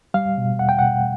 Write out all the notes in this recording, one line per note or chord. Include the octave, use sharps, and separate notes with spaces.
G3 F5
B2
E2 F#5
G5
B2 F#5